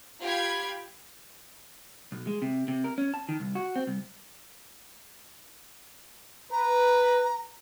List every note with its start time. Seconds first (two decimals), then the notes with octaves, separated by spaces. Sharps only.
0.22 F4 G4 F5 G5 B5 G#6
2.12 B1
2.27 G#3
2.42 C3
2.68 C3
2.84 A#4
2.98 C#4
3.14 A5
3.29 D#3
3.40 C2
3.55 F#4
3.76 C4
3.87 C2
6.51 B4 A#5